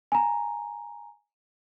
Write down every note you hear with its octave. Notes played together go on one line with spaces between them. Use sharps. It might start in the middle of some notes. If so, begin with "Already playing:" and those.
G#5 A#5